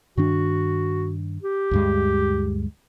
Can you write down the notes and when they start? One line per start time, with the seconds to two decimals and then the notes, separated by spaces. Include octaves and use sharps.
0.17 G2 D#3 D4 F#4
1.42 G4
1.71 D2 G2 G#3